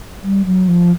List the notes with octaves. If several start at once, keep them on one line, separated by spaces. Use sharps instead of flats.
G3
F#3
F3